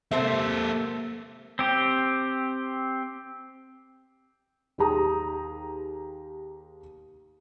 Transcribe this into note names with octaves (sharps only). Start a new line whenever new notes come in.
C3 A#3 A4 C5 E5
C4 G4
D#2 D#4 G4 G#4 A#5 D#6